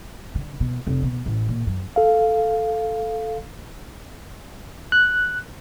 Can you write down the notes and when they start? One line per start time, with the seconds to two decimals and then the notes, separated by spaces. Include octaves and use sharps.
0.35 D3
0.60 B2
0.87 F1
1.02 B2
1.26 A1
1.48 A#2
1.66 F#2
1.96 A4 F5
4.92 F#6